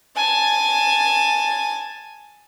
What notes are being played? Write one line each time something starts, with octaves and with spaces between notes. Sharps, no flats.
G#5 A5